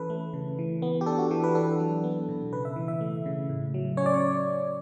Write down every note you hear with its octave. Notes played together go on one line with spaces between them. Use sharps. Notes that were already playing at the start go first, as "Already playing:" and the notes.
Already playing: E3 C#4 A4 B4
A3
C#3
E3
B3
G4
D4 A4
F#4
E3 G4
B4
D4 A4
F#3
B3
B2
C#3 B4
E5
E3
E5
A3
C#3
A2
F#3
C#4 C#5
D5
C#5